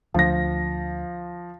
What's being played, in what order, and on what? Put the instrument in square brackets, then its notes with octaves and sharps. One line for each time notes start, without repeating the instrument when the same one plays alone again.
[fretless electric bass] D2 [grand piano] F3 A#6